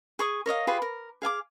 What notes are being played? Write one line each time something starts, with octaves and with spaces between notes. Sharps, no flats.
G#4 C#6 D#6
A#4 C#5 D#5 F5
F4 G4 G#4 B4
A#4
G#4 F5 G#5 D6